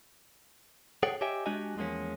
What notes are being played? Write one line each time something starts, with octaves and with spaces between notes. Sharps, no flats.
G#4 A4 C#5 F#5 G5
G4 C#5 D#5 E5 G5 G#5
G#3 D4 F#4 G4 D#5 G#5
E2 F3 G#3 A#3 C#4